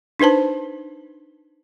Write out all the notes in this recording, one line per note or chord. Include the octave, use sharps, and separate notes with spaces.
D4 D#4 B4 C5 A5